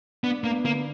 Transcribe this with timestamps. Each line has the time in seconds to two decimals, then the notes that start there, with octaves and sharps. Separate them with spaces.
0.24 B3 D4
0.44 A#3 B3
0.65 D3 A#3